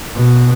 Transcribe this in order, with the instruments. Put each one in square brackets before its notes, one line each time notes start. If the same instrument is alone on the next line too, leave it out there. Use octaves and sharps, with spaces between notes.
[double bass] B2